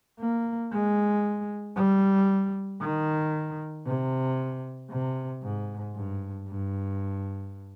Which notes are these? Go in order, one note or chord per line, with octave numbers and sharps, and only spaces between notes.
A#3
G#3
G3
D#3
C3
C3
G#2
G2
G2